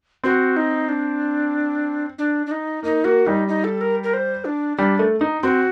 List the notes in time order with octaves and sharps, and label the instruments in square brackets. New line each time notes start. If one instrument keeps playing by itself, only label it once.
[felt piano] C4 [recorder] F#4
[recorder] D#4
D4
D4
D4
D#4
[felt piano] A#3 [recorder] D#4
[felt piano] A#3 [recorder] F#4
[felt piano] G3 [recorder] D#4
[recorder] D#4
A4
A#4
A#4
C5
D4
[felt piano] G3 [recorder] D4
[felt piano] A3
D#4
[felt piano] C4 [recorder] F#4